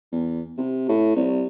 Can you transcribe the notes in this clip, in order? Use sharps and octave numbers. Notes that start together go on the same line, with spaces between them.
E2
C3
A2
C2